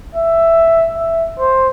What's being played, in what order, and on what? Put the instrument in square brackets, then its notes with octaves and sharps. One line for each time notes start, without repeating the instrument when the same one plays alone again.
[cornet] E5
E5
C5